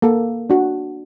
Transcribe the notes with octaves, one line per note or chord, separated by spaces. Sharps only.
A#3 A4
D4 F#4